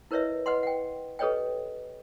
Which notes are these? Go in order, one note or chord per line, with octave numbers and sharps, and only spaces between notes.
E4 A#4 B4 C#5 D#5 E5
B4 D#5 F#5 C6
F#5 G5
G4 A4 B4 C#5 D#5 G5